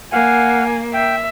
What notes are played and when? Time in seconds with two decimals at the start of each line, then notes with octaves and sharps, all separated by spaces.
0.13 A#3 F5 F#5 G#5
0.94 E5 G5